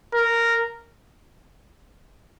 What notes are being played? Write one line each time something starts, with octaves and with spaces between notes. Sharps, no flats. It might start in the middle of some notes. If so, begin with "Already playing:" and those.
A#4